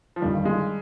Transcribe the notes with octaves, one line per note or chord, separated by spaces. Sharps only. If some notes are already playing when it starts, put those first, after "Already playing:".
F3
G1 G2 D#3 G3
G#3